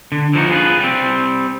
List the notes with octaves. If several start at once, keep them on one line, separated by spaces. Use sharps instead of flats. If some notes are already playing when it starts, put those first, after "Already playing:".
D3
D3 F3 D#4 F#4
F4 G#4 A#4 B4
G3 C4